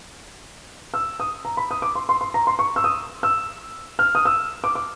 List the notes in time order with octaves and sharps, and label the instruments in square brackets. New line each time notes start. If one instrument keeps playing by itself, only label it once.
[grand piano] E6
D#6
A#5
B5
D#6
D6
C6
C6
C6
A#5
C6
C#6
E6
D#6
E6
F6
D#6
E6
D6
D6